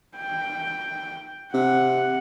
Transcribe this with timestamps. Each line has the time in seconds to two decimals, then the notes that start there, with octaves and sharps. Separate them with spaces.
0.16 G5
1.54 C3 F#5